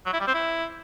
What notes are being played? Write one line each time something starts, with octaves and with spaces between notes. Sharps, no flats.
F#3
E4
G3
C4
E4